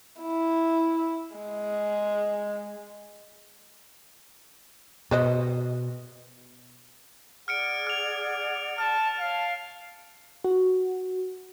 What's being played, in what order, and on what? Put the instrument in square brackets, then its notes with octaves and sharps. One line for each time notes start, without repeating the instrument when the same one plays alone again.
[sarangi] E4
G#3
[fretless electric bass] B2 [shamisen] B4 C5 D#5
[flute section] G#4 D5 F#5 [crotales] F6 C#7 D7
[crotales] F6 F7
[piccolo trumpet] A5 [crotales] F6
[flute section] C#5 A5 [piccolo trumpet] F5
[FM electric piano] F#4